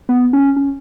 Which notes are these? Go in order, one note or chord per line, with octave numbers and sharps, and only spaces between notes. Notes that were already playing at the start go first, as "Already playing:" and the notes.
B3
C#4
C#4